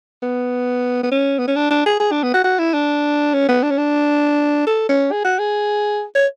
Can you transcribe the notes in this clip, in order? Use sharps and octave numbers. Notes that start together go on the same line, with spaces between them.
B3
B3
C#4
B3
C#4
D4
D4
G#4
G#4
D4
B3
F#4
F#4
E4
D4
C#4
B3
D4
C#4
D4
A4
C#4
G#4
F#4
G#4
C#5